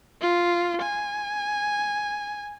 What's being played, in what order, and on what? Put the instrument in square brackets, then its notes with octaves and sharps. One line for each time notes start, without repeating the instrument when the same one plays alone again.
[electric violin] F4
G#5